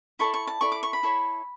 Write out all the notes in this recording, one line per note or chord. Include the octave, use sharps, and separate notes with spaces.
E4 A4 D5 C#6
C#6
A5
E4 A4 D5 C#6
D6
C#6
B5
E4 A4 C#5